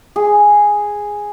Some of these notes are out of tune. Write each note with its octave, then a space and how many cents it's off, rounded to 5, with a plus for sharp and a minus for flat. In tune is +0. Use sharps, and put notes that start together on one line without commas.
G#4 -5